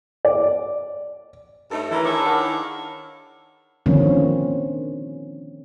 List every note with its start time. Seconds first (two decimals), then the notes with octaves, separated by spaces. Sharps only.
0.25 D5
1.71 G2 A3 D#4 A4 C#5
1.91 E3 E4 A#4 A#5
2.05 D#3 D4 E4 G#4 C#5
2.25 F5 F#5 A5
3.86 D3 D#3 F3 A#3 C4 C#4